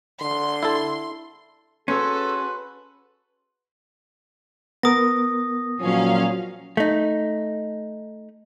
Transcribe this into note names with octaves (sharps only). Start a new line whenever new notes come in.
D3 C6
E4 A4
C#4 F#4 G#4 A4 B4 C6
B3 A#4 D#6 A#6
A#2 F3 F#3 C#4 F5
A3 D#4